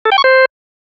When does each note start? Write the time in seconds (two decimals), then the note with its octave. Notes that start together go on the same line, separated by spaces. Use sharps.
0.05 A4
0.12 G5
0.18 C#6
0.24 C5